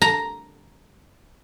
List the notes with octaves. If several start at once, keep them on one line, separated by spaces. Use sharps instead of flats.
A#5